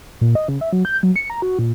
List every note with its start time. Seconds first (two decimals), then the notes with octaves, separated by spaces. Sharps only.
0.21 A#2
0.35 D#5
0.48 C#3
0.61 E5
0.73 F#3
0.85 G6
1.03 F#3
1.16 C#7
1.30 A#5
1.42 F#4
1.59 A#2